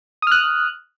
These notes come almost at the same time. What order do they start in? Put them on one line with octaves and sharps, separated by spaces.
D#6 F6 F#6